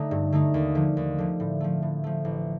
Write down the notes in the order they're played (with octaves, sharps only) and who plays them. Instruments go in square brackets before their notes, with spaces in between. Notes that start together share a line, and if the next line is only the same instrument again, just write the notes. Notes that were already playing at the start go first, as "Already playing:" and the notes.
Already playing: [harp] D3 A3 D#4
G2
D3 A3 D#4
D#2
D3 F3
D#2
D3 F3
A2
F3 A3
A2
F3 A3
A1